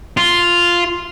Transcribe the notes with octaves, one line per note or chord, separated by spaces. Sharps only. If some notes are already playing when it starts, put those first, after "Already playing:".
F4